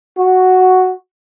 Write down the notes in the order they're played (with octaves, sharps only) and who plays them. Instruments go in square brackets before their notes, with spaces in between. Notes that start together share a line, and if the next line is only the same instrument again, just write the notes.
[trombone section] F#4